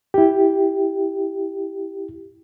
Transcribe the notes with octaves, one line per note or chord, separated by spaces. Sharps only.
E4 G4